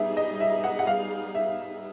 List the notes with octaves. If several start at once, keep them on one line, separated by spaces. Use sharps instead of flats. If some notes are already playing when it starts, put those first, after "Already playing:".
Already playing: G3 B3 D#4 G#4 E5
D#5
E5
F#5
F#5
F5
E5